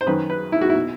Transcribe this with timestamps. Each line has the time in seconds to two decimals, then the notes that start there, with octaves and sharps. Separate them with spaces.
0.01 C5
0.06 F#2 D#3 B4
0.30 B4
0.52 E4
0.61 F#4
0.69 E4
0.75 B2